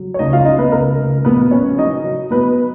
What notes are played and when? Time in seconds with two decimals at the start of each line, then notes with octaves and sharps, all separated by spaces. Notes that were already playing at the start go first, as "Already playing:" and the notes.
Already playing: F#3
0.14 C#5
0.19 C#2 D#4 D#5
0.33 F4 F5
0.45 C#3 D#4 D#5
0.59 B3 B4
0.72 C#2 A#4
0.98 C#2
1.25 A#1 B3 B4
1.51 A#3 C#4 C#5
1.78 F#3 D#4 D#5
2.04 F#3
2.30 F#3 B3 B4